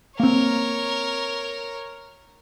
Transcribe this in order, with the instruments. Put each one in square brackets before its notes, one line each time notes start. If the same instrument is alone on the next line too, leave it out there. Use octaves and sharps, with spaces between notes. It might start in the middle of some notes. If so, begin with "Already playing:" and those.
[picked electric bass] A#3 C4 [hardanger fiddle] A#4 C#5